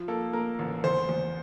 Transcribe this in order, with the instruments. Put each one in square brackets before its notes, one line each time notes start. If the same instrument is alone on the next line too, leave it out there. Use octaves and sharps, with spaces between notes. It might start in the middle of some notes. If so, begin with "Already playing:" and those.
Already playing: [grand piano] F3
[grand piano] A#3 [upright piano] A4
[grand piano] A#3 [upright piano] A#4
[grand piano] A1
[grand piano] E2 [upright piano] C5
[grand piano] E2